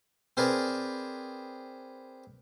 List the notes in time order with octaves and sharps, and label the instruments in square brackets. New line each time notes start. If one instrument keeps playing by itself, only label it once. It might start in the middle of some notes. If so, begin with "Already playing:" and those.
[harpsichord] C4 G#4 A#4 B4 D5